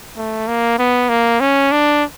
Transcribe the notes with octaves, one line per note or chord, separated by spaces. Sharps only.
A3
A#3
B3
A#3
C#4
D4